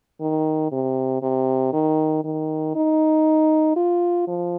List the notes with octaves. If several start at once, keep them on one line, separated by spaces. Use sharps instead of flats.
D#3
C3
C3
D#3
D#3
D#4
F4
F3